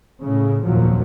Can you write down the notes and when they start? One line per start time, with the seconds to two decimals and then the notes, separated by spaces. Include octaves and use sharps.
0.21 A2 C#3
0.63 F1 D#2 A#2 F3 F#3